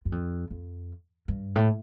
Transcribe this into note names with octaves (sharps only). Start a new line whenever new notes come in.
F#2
F2
F2
G2
A2